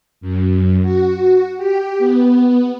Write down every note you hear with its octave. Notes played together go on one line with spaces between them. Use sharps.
F#2
F#4
G4
B3